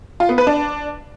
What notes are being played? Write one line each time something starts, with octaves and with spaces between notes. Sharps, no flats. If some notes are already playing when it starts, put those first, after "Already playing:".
F4
B3
B4
D4